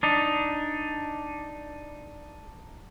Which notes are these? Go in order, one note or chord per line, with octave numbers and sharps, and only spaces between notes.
D4 D#4